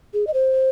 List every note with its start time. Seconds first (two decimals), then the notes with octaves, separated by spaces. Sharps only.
0.14 G#4
0.27 D#5
0.34 C5